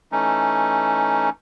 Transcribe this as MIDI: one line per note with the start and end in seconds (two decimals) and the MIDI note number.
0.12 1.29 52
0.12 1.29 57
0.12 1.29 61
0.12 1.29 63